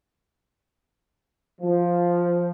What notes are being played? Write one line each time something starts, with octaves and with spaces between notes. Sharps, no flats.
F3